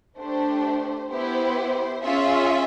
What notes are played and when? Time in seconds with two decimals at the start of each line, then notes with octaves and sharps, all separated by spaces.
0.19 A3 D4 G4 C5
1.11 B3 E4 G4 C5
2.03 C#4 F4 G#4 E5